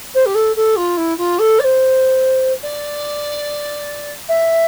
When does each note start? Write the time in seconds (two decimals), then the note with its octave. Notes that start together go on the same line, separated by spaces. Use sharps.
0.14 C5
0.26 G4
0.35 A4
0.56 A4
0.76 F4
0.97 E4
1.18 F4
1.39 A4
1.59 D5
1.64 C5
2.63 D5
4.29 E5